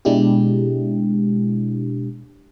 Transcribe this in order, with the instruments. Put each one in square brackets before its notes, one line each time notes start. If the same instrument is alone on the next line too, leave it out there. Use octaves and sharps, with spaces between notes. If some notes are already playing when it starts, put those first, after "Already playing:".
[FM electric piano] B2 G#3 D4 E4 G4